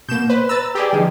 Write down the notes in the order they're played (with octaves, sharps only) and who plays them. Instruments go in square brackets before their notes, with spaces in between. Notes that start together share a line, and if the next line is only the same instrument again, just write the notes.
[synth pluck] B2 A#3 [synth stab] G6 E7
[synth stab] B4 [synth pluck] C5
[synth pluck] B4 A#5 [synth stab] E6 A6
[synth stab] G4 G#4 D5
[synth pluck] D3 F3 D#4